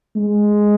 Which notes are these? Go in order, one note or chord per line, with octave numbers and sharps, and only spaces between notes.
G#3